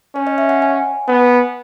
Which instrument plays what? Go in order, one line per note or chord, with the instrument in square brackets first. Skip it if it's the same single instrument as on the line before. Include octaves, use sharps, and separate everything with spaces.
[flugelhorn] C#4 [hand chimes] C#5
[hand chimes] D#5
E5
F#5
G#5
[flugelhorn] B3